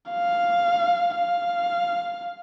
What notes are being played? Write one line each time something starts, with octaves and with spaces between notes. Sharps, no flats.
F5
F5